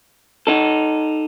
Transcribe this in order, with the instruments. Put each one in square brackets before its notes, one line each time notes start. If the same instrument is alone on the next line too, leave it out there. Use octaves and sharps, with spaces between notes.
[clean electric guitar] D#4 A4